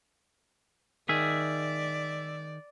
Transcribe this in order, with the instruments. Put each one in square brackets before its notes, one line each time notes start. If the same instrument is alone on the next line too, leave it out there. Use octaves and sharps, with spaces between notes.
[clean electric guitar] D#3 G#4 [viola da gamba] D5 [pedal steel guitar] E5